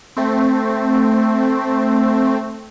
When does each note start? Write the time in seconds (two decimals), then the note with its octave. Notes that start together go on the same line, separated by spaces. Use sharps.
0.17 A3 C4